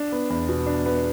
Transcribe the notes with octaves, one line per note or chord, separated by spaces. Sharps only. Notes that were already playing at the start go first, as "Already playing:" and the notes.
Already playing: D4
B3
E2
B2
D4
B3